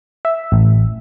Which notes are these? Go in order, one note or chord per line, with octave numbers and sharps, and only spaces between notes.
E5
A1